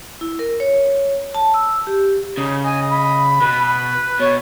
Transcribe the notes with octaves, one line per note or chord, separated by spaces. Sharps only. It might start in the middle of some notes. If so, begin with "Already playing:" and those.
E4
A#4
C#5
A5
E6
G4
C#3 D#4
D#5 G#5
B5
B2 B4
B2 C#5